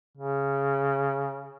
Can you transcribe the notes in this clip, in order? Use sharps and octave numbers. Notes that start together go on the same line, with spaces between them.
C#3